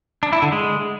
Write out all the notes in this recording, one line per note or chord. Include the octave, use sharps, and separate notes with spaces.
D4
E4
D3
G#3